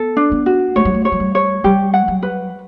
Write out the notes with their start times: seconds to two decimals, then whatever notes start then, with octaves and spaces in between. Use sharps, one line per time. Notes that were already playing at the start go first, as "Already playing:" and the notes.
Already playing: B3 A4
0.17 D4
0.32 B3
0.46 F#4
0.76 A3 C#5
0.85 G3
0.94 A3
1.05 C#5
1.12 F#3
1.20 G3
1.35 C#5
1.64 G3 G4
1.94 F#5
2.08 F#3
2.23 B4